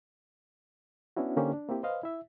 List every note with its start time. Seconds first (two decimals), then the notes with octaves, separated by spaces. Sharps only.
1.17 B3 C#4 D4 E4 F#4
1.36 D3 A#3 C#4 D#4 G4 C5
1.53 D4
1.68 A#3 C4 E4 G4
1.83 B4 C5 D#5 F5
2.03 E4 E5